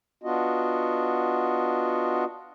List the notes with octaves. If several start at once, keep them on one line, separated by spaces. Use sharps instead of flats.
B3 D4 F4 F#4 D#5